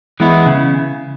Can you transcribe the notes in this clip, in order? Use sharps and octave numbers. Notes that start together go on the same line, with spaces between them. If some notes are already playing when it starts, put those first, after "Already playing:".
E3 G#3 B3 E4
C#3